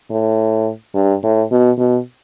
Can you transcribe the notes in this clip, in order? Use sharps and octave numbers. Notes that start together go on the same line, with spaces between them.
A2
G2
A2
B2
B2